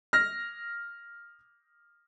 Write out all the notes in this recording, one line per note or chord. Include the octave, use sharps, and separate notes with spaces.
F6 A#6